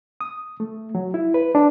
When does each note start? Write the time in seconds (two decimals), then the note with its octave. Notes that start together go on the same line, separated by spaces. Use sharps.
0.21 D#6
0.60 A3
0.95 F#3
1.14 E4
1.34 B4
1.55 D4